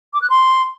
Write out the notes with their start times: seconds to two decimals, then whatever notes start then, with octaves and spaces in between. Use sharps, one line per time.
0.14 D6
0.22 F#6
0.30 C6